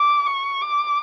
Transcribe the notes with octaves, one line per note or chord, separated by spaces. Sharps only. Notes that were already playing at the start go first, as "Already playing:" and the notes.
Already playing: D6
C#6
D6